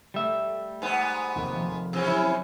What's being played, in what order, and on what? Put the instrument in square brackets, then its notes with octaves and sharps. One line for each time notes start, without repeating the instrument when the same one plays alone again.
[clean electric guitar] G3 E5 [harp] A3
[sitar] G#2 B3 [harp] G#5 E6
[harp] F1 D#2 G5
F3
[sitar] C3 E3 C#4 [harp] F#5 G#5 E6
[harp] F#3 [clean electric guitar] E4